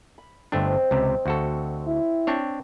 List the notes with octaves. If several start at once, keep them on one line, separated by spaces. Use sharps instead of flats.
B5
G1 A3 C4 D4 D#5
C#2 C3
D2 F#4 A4
E4
C4 D4 C#5